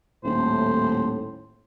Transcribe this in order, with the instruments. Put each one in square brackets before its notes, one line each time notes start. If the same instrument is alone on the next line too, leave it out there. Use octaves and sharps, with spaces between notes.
[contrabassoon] D#1 [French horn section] A2 [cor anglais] C5